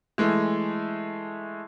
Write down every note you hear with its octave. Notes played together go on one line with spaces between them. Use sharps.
E3 G#3 A3